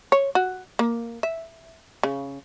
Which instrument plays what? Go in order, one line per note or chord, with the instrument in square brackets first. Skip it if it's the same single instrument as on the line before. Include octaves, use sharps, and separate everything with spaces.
[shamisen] C#5
F#4
A#3
E5
C#3